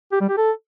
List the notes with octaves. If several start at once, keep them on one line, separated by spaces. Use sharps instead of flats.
G4
G3
G4
A4